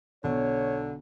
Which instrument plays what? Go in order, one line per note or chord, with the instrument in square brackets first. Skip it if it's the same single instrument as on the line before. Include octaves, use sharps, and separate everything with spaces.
[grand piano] B1 [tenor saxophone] D3 [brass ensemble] C#5